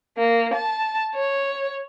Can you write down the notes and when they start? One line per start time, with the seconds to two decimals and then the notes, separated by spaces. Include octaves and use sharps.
0.17 A#3
0.54 A5
1.15 C#5